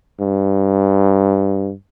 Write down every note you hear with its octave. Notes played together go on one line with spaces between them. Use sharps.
G2